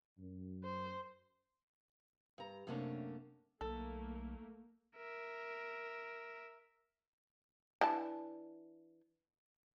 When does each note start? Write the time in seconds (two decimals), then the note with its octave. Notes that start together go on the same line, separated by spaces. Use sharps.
0.19 F#2
0.64 C5
2.38 G2 A#5
2.67 F#2 C3 A3 A#3 C#4 D4
3.61 B1 A3 A#3 A4
4.96 A#4 E5
7.81 E3 D4 A5